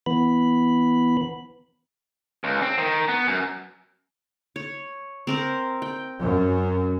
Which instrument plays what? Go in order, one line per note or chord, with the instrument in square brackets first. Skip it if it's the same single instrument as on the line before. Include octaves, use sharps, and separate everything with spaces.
[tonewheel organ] E3 B3 B5
[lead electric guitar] C#2
C4
D#3
B3
F#2
[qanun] C#5
C4 A#4 C5
G5
[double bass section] F#2